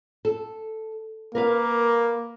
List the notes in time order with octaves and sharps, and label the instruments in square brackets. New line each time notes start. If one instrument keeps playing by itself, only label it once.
[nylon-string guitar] A4
[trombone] A#3 [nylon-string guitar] A#4 B4 F5